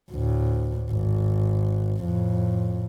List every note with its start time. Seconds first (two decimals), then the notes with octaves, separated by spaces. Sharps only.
0.12 D2 A2
0.90 G#1
2.04 F2 A2